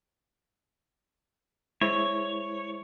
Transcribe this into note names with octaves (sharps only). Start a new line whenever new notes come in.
G#3 E4 C5 C#5